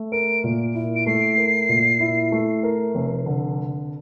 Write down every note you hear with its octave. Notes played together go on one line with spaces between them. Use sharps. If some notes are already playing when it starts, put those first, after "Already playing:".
Already playing: A3
A#4 D7
A#2
E4
D7
A3 C7
A#4
A#2
E4
A3
A#4
F1
D3